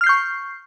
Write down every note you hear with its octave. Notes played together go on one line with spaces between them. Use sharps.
C#6 F6 G6 C7